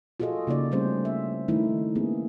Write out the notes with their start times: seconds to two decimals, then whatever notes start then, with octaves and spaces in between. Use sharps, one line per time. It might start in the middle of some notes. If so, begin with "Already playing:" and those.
0.20 F4 F#4 G#4 A4 D#5
0.47 C#3 A#3 D#4 D5
0.71 G3 A3 C4 C#4 G#4 C5
1.05 E5
1.48 D#3 A3 D#4 E4
1.95 A#3 B3 C#4 G#4